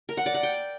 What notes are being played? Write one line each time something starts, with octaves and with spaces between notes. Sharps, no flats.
A#4
F#5
D5
F#5
G5